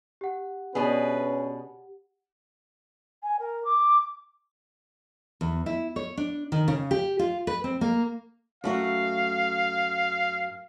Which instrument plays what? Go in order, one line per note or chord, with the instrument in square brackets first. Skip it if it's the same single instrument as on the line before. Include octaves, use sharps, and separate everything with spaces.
[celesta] G4 F#5
[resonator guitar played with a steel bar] B2 D4 G#4 [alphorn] C#4 [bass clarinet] B4
[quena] G#5
A#4
D6
[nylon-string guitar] E2
E4
C#5
D4
D#3
C#3
G4
F4
B4
C4
A#3
[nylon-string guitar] F#2 A3 F#4 [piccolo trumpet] F5